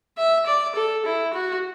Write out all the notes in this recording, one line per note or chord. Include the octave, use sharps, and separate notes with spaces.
E5
D5
A4
E4
F#4